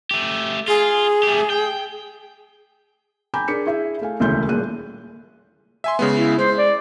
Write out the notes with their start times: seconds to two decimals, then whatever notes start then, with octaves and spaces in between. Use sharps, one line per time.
0.11 A3 G4
0.68 F4 G#4
1.23 A3 G4
1.50 G5
3.34 G5 G#5 A#5 B5 D6 G6
3.48 D4 G#4 A#4 B6 C#7
3.67 E4 G#4 E5
4.01 A3 F5 G#5
4.20 E1 D2 C#3 E4 C6 G6
4.48 D#1 D#2 A#2 G#4 F#6 D#7
5.84 E5 G#5 C6
5.99 C#3 G#3 B3
6.14 E4
6.39 G#3 C5
6.58 D5